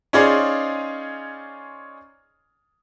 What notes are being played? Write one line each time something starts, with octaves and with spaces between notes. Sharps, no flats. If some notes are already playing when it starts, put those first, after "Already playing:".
C#4 D#4 F4 G#4 C5 D5